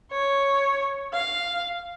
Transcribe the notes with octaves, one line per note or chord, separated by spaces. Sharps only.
C#5
F5